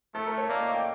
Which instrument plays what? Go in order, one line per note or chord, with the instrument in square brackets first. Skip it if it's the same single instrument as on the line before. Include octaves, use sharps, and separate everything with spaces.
[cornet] A3 [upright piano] A4
[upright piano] A#4
C#5
[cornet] A#3 [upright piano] D5
[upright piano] D#5
F5
G5